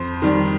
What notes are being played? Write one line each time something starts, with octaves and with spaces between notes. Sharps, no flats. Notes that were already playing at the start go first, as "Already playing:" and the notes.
Already playing: F2 C5
D#3 G3